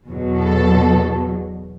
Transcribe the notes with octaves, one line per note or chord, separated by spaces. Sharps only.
E2 B2 F#3
A4